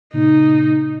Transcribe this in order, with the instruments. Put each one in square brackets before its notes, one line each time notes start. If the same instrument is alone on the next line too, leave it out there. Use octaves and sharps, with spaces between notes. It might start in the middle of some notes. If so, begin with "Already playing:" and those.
[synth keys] A#2 C#3 [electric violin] D#4